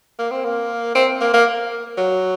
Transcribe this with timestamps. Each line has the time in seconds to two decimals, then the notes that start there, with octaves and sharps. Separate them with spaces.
0.18 A#3
0.31 C4
0.45 A#3
0.95 C4
1.21 A#3
1.33 A#3
1.97 F#3